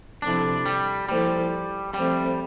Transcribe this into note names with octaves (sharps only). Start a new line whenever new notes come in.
C3 F3 C4 D4 E4 A4
G3
F3 G3 A#3 E4 A4 C5
F3 G3 A3 C4